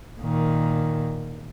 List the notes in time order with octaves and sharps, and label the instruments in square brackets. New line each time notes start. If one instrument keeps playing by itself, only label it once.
[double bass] A#2 D#3